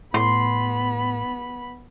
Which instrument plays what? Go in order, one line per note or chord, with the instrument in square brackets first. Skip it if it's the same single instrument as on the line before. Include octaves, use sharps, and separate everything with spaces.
[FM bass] A2 [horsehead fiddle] B3 B5 [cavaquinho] C6